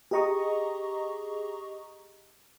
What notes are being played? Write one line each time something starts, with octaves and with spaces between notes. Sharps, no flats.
G4 G#4 D#5 A#5 C#6 D#6